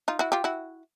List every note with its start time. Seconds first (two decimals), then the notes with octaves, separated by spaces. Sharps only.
0.08 D#4 F4
0.19 E4 F#4
0.32 F4 G4
0.44 E4 F#4